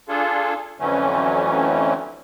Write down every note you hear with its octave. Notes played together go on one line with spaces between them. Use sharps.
D4 F4 G#4 A4
F2 D3 E3 F#3 A3 C#4